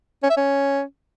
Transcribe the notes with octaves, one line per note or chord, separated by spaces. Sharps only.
C#4
E5
C#4